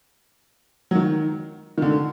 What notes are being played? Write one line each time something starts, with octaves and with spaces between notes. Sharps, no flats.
F#3
D#3
D#3
D3